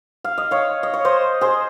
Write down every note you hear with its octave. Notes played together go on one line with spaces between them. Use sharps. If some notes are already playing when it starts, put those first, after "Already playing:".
F5
D#5
C#5 F5
D#5
C#5
C5 D#5
G#4 C5